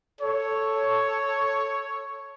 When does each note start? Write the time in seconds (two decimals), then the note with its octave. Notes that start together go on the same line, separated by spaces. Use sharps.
0.21 A4 C#5